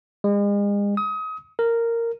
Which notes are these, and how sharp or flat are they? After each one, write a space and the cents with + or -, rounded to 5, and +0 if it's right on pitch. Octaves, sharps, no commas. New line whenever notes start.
G#3 -40
D#6 +30
A#4 -10